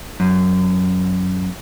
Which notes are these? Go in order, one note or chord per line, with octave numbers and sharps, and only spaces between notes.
F#2